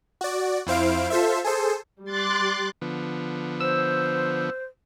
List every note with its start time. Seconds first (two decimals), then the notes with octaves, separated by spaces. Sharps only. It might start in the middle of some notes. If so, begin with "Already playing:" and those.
0.21 F#4 D5
0.67 F2 E4 C5 F5 D7
1.10 F4 A4 C5 E5
1.44 G#4 A4 C5
2.05 G3 C6 D6 F#6 A6
2.82 D3 F3 B3
3.61 C5 E6